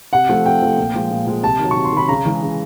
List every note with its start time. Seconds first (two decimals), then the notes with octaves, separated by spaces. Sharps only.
0.13 C3 F#5
0.29 F3 A3
0.45 C3 G5
0.62 F3 A3
0.78 A#2
0.94 F3 G#3
1.11 A#2
1.27 F3 G#3
1.43 C3 A5
1.59 D#3
1.64 F#3
1.71 C3 C#6
1.84 C6
1.93 D#3 F#3 B5
2.08 C#3 A#5
2.25 E3 G#3
2.42 C#3